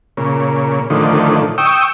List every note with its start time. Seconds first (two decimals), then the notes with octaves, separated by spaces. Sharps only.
0.17 A#2 C#3
0.90 A2 D3 D#3 F3
1.58 G5 C#6 D#6 E6